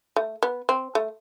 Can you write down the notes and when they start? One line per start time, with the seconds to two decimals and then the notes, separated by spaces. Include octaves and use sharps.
0.16 A3
0.43 B3
0.69 C4
0.95 A3